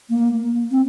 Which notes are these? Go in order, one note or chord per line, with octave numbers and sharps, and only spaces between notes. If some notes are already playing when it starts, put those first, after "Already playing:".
A#3
C4